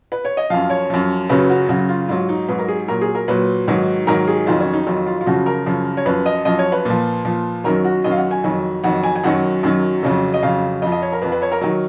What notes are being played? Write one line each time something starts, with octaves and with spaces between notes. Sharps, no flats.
B4
C#5
D#5
F#2 F3 F5
C#5
F#2 F3
F#2 C#3 F#3 B4
F#4
F#2 C#3 F#3 F#4
F4
G#2 F#3 F4
D#4
G#2 F#3 B4
A#4
G#4
A#2 F#3 A#4
G#4
A#4
A#2 F#3 B4
G#2 D#3 F#3
G#2 D#3 F#3 A#4
G#4
F2 D#3 F#3 F4
C#4
D#4
F2 D#3 F#3 F4
F4
F4
F#2 C#3 F3 F#4
A#4
F#2 C#3 F3
C#5
F#2 F3 B4
D#5
F#2 F3 D#5
C#5
B4
A#2 F3
A#2 F3
F#2 D#3 F#3 A#4
F#4
F#2 D#3 F#3 D#5
F5
F#5
G#5
F2 D#3 F#3
F2 D#3 F#3 F#5
G#5
G#5
F#2 D#3 F#3 F#5
F#2 D#3 F#3
F2 C#3 F#3
D#5
F2 C#3 F#3 F5
F2 F3 D#5
D#5
C#5
A#4
F2 F3 B4
B4
C#5
A#4
D#3 F#3